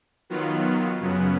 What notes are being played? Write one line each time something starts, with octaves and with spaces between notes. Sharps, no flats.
D#3 F#3 B3 F4
F#2 C#3 F#3 B3